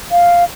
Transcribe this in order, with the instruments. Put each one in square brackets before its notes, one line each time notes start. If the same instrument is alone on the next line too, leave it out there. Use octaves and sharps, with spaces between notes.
[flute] F5